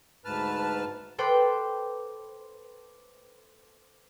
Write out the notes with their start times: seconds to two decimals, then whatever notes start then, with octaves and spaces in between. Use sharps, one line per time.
0.25 D2 G#2 B4 A5 F6
1.18 A4 B4 C5 G5 D6